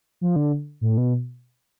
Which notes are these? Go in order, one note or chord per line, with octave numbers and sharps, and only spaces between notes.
F3
D3
A2
B2